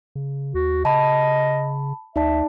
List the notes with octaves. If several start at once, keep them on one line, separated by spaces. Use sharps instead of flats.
C#3
D#2 F#4
C#3 D#5 A5 B5
D2 D#4 D5 E5 A5